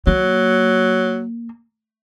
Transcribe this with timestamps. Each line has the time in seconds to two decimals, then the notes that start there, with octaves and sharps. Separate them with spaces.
0.07 F#3 A#3